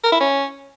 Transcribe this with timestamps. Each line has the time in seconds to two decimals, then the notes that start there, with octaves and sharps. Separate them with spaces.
0.04 A#4
0.12 E4
0.20 C#4